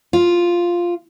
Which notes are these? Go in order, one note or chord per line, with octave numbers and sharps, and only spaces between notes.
F4